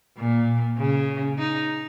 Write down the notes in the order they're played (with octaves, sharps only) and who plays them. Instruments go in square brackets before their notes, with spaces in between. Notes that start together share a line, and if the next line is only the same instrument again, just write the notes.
[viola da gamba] A#2
C#3
D#4